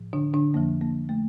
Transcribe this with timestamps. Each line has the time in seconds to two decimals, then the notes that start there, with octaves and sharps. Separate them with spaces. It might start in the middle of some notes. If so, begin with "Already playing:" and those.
Already playing: A2 F3
0.13 D3 D4
0.34 D3 D4
0.54 F2 D3 F3 A#3
0.81 A#3
1.09 A3